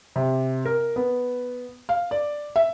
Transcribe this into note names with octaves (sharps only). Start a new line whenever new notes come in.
C3
A#4
B3
F5
D5
E5